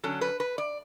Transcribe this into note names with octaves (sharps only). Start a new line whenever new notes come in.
D3 F#3 C#4 A4
B4
B4
D5